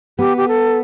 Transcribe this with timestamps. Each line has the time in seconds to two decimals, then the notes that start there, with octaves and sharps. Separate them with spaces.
0.19 B3 G4
0.37 G4
0.48 A4